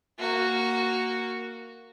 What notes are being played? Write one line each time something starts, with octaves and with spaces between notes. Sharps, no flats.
A#3 F#4